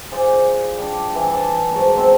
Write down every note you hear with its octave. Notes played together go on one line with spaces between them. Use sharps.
F4 G#4 C5 D5
G3 D4
E3 D5
D5 A5
G#2 F#3 A#4 A5
B2 C4 E5